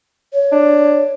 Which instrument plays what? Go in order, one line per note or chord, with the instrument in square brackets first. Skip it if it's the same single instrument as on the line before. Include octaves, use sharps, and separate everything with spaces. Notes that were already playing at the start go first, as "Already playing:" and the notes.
[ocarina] C#5
[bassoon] D4